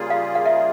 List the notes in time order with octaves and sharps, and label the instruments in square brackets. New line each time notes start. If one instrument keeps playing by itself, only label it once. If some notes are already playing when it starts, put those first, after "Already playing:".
Already playing: [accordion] C#3 G3 A#3 F4 G#4
[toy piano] F5
F5
E5